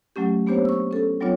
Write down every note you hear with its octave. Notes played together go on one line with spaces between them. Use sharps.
F#3 A3 C#4 G4
A#3 B3 D4 G4 C5 C#5
C#6 E6
C#4 A4
F#3 G3 B3 D4 F4 C#5